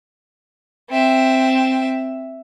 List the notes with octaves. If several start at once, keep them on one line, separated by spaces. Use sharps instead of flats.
C4 E5